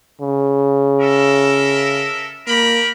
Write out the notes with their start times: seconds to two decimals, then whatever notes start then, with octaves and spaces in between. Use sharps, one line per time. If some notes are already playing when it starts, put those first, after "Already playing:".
0.21 C#3
1.00 A4 A#4 E5
2.47 A#3 G4 A#4 B5